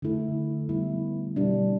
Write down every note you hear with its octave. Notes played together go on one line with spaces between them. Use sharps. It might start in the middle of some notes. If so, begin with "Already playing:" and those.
D3 A3 E4 A4
G3 B3 E4
B2 G3 D4